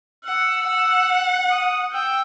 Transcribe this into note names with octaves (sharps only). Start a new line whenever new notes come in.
F#5 E6
F#5
D#6
G5 E6